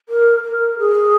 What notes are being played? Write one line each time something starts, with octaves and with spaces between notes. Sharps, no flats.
A#4
A#4
G#4